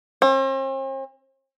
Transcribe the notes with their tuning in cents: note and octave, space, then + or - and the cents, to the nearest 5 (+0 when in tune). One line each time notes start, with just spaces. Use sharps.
C4 +45